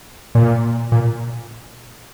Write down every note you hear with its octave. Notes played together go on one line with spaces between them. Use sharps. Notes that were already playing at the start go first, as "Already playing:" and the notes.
A#2
A#2